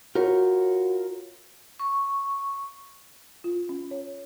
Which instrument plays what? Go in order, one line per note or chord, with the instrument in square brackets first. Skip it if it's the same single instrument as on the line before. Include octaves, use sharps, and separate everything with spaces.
[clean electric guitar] F4 A#4 C#5 [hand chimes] F#4
[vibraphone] C#6
[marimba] F4
C#4
C#5